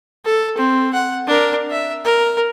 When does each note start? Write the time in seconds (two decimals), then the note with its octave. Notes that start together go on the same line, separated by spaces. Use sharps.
0.25 A4
0.58 C4
0.94 F#5
1.27 D4 A#4
1.71 E5
2.05 A#4